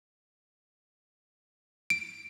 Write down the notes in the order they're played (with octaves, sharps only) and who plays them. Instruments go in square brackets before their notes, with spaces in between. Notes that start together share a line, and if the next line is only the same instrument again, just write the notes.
[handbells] D7